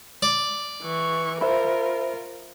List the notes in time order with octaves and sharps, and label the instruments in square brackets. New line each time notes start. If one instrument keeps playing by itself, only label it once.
[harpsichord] D5
[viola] E3 C#6
[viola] F4 A#4 [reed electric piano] C5 E5 B5